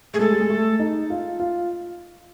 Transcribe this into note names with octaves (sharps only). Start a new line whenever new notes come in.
A3 G#4
G#3 A4
G3
G#3
A3
D#4
F4
F4